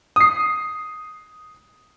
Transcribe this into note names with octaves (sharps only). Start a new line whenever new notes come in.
D#6 C7